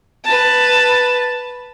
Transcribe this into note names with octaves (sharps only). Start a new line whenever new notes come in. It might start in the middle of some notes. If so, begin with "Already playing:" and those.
B4 A5